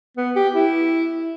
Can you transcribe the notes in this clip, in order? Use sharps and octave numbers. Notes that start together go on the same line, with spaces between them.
B3
G4
E4